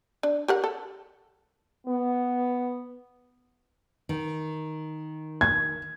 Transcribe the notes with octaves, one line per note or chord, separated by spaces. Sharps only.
D4
G4 A#4 F#5
A4
B3
D#3
G#6